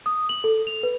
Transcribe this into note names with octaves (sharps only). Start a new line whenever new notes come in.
D#6
F#7
A4
F7
B4